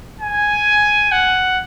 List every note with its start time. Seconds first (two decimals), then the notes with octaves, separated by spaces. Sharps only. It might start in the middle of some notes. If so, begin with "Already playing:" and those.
0.20 G#5
1.12 F#5